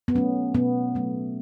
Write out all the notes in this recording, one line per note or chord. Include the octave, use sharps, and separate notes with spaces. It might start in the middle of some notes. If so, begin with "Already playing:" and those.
B3
F#3 A3 C#4
B2 B3
F#3 A3